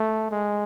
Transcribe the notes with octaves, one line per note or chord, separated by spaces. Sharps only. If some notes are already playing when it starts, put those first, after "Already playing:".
Already playing: A3
G#3